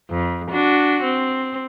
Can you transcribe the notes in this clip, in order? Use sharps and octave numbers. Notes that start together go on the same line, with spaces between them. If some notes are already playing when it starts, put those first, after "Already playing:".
F2
D4 F#4
C4